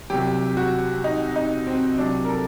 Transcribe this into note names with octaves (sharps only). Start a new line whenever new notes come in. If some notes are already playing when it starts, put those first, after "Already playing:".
C2 C3 F#3 G4
F#4
D#4
D#4
C4
C2 C3 F#3 D4
A#4
A4